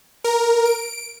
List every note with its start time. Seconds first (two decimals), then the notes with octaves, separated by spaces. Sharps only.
0.24 A#4
0.65 D7